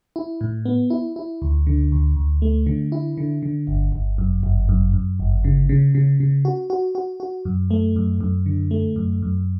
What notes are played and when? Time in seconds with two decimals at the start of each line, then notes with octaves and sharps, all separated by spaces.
0.16 E4
0.41 A2
0.65 B3
0.90 E4
1.16 E4
1.42 D2
1.67 D3
1.92 D2
2.17 D2
2.42 A3
2.66 D3
2.92 E4
3.17 D3
3.43 D3
3.67 G1
3.92 G1
4.18 F#2
4.43 G1
4.69 F#2
4.93 F#2
5.19 G1
5.44 C#3
5.69 C#3
5.95 C#3
6.20 C#3
6.45 F#4
6.70 F#4
6.95 F#4
7.20 F#4
7.45 F#2
7.71 A3
7.96 F#2
8.21 F#2
8.46 D3
8.71 A3
8.96 F#2
9.22 F#2